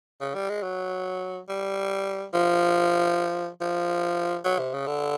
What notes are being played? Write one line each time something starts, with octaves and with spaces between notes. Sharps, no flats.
C#3
G3
G#3
F#3
G3
F3
F3
F#3
C3
C#3
D3